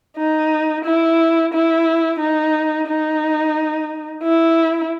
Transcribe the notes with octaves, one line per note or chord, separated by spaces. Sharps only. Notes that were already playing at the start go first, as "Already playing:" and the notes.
D#4
E4
E4
D#4
D#4
E4